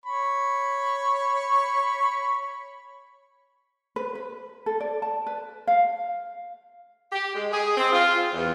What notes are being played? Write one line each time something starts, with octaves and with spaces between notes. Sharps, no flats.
C#5 B5 C#6
B4
B4
A4
D5
A5
B4
F5
G4
G#3
G#4
C4
F4
E2